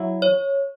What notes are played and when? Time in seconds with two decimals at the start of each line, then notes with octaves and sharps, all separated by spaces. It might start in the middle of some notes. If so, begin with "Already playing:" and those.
Already playing: F#3 E4
0.22 C#5